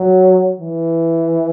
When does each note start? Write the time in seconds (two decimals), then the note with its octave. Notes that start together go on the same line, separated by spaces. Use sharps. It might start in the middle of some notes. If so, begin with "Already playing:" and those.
Already playing: F#3
0.60 E3